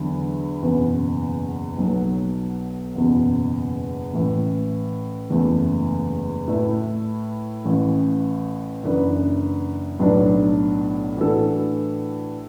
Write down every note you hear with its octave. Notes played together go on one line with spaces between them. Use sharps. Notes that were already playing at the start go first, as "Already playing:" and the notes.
Already playing: E2 D3 F#3 E4
F#1 E2 B2
B1 B2 F#3
F#1 E2 B2
A1 A2 E3
F#1 E2 E3 A3
A2 A3 E4 B4
A1 A2 E3
F#1 F#2 E3 D4 B4
B1 A2 F#3 B3 D4
A2 E3 D4 F#4 A4